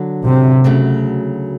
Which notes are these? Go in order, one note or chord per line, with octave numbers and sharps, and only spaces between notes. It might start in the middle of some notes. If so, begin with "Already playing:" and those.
Already playing: D3 F#3
C3
D2 C#3 F#3 A3